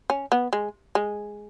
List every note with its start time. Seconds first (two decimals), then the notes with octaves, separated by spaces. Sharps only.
0.10 C#4
0.32 B3
0.53 G#3
0.95 G#3